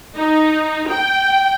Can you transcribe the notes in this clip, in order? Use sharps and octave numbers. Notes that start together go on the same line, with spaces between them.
D#4
G5